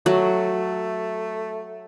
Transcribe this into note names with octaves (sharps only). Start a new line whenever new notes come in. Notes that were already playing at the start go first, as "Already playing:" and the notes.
F#3 A3